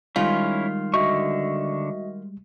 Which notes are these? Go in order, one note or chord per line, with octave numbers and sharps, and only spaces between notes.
D#3 G3 G#3 C#4 E4 F4
D3 F#4 D#5 E5 C#6